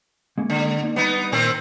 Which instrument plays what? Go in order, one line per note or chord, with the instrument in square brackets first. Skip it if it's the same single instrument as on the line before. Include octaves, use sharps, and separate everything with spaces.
[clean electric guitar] G#3 A#3 C#4
[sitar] D3
[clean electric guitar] A#3 D#4
[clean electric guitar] G3 B5 [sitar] B3 D#4
[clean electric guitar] A#2 [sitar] D#3 C4 A#4